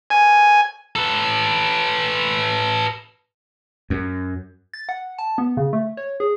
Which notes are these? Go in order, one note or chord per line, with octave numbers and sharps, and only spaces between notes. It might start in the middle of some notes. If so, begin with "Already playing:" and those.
G#5
A4 B4
F#2
A6
F#5
A5
B3
C#3
A3
C#5
G#4